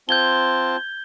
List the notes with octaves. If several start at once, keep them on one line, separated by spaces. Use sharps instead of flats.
C4 F4 A5 G6 G#6 G7